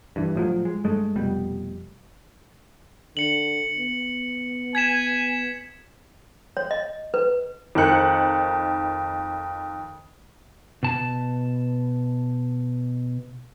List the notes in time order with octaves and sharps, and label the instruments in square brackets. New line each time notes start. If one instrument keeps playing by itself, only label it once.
[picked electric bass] G2 E3
A2 F3 F#3
G#3
G2 G#3 A3
F1 B2 G3
[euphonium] D3 [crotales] C#7 F#7
[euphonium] B3
[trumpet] G#5 [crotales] G#6 B6 E7
[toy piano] C#5
D#5
B4
[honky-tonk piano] F2 D#3 A#4 F#6 C#7
[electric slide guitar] B2 A5